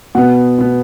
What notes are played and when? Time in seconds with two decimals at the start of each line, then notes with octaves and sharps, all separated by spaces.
0.15 B2 B3 F#5
0.59 B2 B3